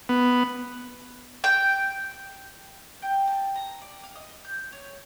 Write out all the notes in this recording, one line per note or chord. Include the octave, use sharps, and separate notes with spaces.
B3
G5
G5
A5
A#5
D5
F5
D#5
G6
C#5